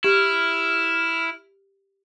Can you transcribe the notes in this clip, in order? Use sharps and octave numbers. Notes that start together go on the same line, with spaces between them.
E4 G4 F6